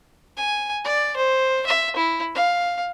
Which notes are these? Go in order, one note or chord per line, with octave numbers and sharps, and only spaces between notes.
G#5
D5
C5
E5
E4
F5